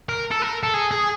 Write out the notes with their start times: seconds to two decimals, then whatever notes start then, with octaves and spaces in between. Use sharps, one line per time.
0.09 A#4
0.31 A4
0.42 A#4
0.63 A4
0.74 G#4
0.91 G#4